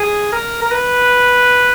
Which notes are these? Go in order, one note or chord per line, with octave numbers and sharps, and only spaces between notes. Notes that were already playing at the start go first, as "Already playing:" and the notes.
Already playing: G#4
A#4
A#4
B4